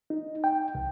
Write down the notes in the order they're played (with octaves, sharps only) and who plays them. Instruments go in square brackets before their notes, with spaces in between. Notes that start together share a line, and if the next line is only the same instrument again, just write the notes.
[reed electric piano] D#4
G5
C2